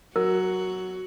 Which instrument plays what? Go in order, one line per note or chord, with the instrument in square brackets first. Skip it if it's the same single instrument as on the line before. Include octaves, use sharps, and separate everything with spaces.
[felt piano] F#3 [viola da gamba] F#4 [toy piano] A#4